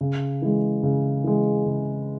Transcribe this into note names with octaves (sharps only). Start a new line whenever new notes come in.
C#3
E3 G#3
C#3
E3 G#3
C#3